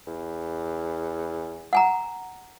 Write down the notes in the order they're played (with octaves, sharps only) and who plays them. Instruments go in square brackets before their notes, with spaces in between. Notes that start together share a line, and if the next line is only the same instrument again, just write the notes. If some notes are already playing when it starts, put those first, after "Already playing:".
[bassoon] E2
[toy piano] F#5 G#5 A#5